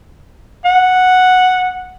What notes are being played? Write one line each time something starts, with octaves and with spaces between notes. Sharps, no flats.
F#5